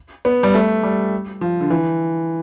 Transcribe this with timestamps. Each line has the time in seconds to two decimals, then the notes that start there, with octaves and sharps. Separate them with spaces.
0.25 B3
0.43 G3
0.54 A3
0.83 G3
1.41 F3
1.60 D3
1.70 E3